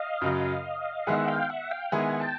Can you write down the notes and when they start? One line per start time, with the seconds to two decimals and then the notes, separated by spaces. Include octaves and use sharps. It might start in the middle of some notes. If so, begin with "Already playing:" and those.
Already playing: D#5 F5
0.21 F#2 C#3 F#3
1.07 D#3 G#3 B3 E4 G#4 E5 F#5
1.28 F5 G5
1.49 E5 F#5
1.71 F5 G5
1.92 D#3 G#3 B3 E4 G#4 F#5 G#5
2.20 G5 A5